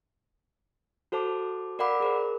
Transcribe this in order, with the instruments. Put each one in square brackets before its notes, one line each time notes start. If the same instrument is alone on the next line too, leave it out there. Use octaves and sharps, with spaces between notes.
[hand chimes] F#4 A4 C5 A5 D6
A#4 D5 F5 F#5 B5 D6
G#4 A#4 C5